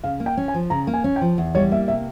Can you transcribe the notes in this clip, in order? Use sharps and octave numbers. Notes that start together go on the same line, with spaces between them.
C#3 F5
A#3
G5
C#4
G#5
F3
C#3 A#5
A#3
G#5
C#4
G5
F3
E2
G3 C#5
A#3 E5
C3 E5